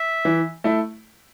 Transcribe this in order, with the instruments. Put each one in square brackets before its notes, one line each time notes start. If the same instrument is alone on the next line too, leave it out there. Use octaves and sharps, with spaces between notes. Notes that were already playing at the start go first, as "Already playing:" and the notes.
Already playing: [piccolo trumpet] E5
[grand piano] E3
A3 E4